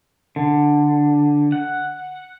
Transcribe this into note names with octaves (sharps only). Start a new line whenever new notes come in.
D3
F#5